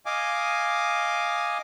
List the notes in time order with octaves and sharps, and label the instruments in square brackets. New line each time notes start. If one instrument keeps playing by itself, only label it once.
[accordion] D#5 F5 G#5 D6